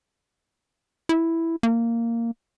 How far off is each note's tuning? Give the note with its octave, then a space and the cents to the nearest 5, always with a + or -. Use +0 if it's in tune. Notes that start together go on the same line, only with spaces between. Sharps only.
E4 +0
A#3 -10